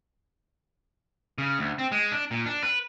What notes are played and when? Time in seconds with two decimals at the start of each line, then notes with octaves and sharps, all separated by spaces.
1.38 C#3
1.59 D2
1.79 C4
1.92 G#3
2.12 D4
2.31 A#2
2.46 D4
2.63 B4